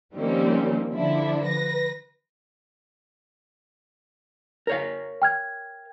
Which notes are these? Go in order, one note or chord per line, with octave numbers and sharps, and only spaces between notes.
D#3 F3 G3 A#3 C4 C#4
D3 F3 D4 E4
B4 A#6
A#4 C#5 F5
G5 F6 G#6